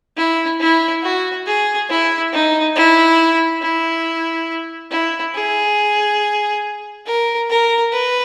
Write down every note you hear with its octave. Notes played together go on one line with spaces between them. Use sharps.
E4
E4
F#4
G#4
E4
D#4
E4
E4
E4
G#4
A#4
A#4
B4